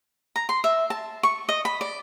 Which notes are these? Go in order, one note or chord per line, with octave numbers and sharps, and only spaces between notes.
A#5
C6
E5
A5
C#6
D#5
B5
D5